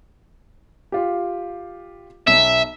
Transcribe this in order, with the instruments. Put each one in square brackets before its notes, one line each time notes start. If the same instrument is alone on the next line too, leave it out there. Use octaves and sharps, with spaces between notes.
[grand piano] F4 G4
[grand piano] B1 [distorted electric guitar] E5